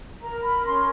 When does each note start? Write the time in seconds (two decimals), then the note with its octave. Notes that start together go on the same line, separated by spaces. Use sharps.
0.22 A#4 A#5
0.44 B5
0.66 C#4 C6